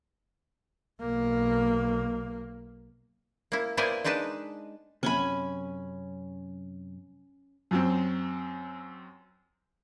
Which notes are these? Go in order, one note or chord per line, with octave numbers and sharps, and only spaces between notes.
B1 A#3
A#3 E4
A#3 B3 E4 C5 D5 G#5
G#3 D4 D#4 B4 A5
F#2 C3 C#4 G#5 B5
F#2 F#3 C4